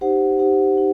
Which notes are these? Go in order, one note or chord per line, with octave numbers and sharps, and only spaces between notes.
D#4 G4 C5 F#5
D#4 G4 C5 F#5
D#4